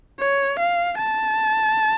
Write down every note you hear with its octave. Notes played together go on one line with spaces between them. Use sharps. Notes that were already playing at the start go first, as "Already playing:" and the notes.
C#5
F5
A5